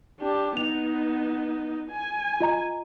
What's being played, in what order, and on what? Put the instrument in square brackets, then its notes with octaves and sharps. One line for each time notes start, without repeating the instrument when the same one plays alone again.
[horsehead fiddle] D4 G4
[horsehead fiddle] B3 D#4 [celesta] F7
[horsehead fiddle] G#5
[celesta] F4 D#5 A#5